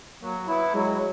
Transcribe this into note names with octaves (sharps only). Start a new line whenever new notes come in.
F#3 A#3
B3 E4
F#3 G#3